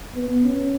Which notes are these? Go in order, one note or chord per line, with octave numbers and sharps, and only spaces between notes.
B3
C#4